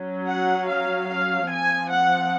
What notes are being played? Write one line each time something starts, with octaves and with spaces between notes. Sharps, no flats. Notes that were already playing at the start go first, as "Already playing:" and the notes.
Already playing: F#3 C#4
F#5
F5
F5
F3 C4 G#5
F#5